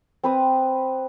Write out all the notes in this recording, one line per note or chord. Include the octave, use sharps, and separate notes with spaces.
C4 B4 D#6